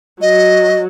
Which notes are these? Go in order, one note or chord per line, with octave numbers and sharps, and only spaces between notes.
F#3 D#5